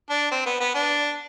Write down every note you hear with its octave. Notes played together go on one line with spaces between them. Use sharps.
D4
C4
B3
B3
D4